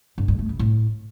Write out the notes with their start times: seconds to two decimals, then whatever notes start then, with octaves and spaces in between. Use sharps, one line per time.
0.18 G2
0.28 G2
0.39 A3
0.49 C#3
0.59 A2